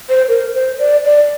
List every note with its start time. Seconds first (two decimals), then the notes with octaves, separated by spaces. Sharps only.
0.10 C5
0.28 A#4
0.54 C5
0.79 D5
1.05 D5